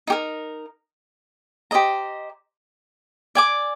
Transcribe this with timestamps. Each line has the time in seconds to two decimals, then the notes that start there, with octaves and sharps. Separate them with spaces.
0.07 D#4 G4 A#4
1.71 G4 C5 D#5 A#5
3.35 D5 G#5 D6